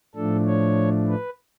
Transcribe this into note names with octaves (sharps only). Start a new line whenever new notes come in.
A2 F3 A3 D4 A4
C#5
B4